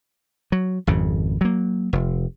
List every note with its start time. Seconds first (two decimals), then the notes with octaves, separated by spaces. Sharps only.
0.52 F#3
0.87 G#1 F2 C#3
1.41 F#3 A#3
1.93 F1